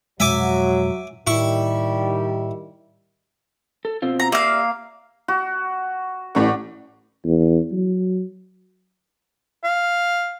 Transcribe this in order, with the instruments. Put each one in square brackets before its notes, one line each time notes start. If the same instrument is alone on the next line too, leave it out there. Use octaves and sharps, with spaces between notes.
[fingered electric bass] F2 B2 G#3 [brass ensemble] F#3 [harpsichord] E5 G#5 D6
[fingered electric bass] A2 [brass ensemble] D#3 G3 [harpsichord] E4 C#6
[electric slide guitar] A4
B2 C4 F4
[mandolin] A#5
[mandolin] A#3 F5 [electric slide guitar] G4 D5 E5
[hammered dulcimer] F#4
[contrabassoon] A1 [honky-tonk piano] A2 C#6 [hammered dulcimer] D5 F#5
[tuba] E2
F#3
[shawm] F5